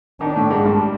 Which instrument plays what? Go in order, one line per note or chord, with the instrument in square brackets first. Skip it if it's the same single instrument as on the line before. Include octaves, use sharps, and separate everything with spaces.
[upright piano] D#3 D#4 [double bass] D4
[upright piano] A2 A3
G#2 G#3
G2 G3